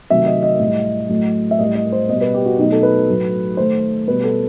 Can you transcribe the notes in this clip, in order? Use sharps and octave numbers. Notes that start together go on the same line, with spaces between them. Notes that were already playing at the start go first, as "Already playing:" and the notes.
C3 D#3 F#3 A3 E5
D#5
D#5
A2 G3
A2 F#3 A3
E5
A2 G3 D#5
D#5
C5
B2 G3 D#5
B4
G4
F#4
B2 F#3 A3 D#4
A4
B4
A2 F#3 A3
D#3 A3 C5
B2 G3 B4
A4